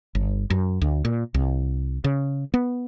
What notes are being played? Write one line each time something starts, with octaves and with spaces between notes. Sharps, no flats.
G1
F#2
D2
A#2
C2
C#3
B3